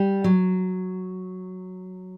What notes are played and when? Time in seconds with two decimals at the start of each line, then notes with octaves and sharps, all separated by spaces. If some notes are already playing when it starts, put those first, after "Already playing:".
Already playing: G3
0.24 F#3